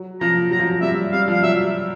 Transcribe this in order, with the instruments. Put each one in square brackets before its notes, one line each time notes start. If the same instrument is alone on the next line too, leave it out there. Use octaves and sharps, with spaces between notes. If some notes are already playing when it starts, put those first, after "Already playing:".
Already playing: [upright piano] F#3
[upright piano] F3 [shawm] A#5
[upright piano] F#3 [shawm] A#5
[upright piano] F3
F#3
[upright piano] G3 [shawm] E5
[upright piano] G3 [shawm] F5
[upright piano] F3 [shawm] F5
[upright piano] F#3 [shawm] E5